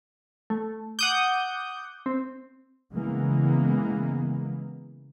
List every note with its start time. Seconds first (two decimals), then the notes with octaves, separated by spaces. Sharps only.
0.50 A3
0.99 F#5 D6 D#6 G6
2.06 C4
2.94 C#3 E3 G#3 A#3 B3